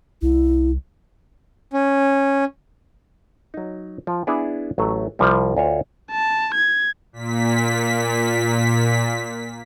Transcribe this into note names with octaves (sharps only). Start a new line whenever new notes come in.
C2 E4
C#4
F#3 D#4
F3
B3 D4 E4 G#4
A1 F#3 A3
C2 F3 G3
D2 F4 C5 C#5
A5
G#6
A#2 B6